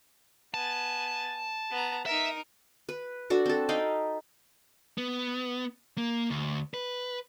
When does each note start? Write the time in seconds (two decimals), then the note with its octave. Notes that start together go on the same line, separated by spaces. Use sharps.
0.54 B3 G#5 A5
1.71 B3 A#5
2.06 D#4 A#4 E5
2.89 B4
3.30 D4 F#4 A4
3.46 C4 A4
3.69 D#4 F5 G5 B5
4.98 B3
5.98 A#3
6.30 D2
6.74 B4